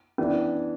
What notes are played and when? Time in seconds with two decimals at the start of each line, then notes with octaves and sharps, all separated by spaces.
0.18 E3 B3 C#4 D4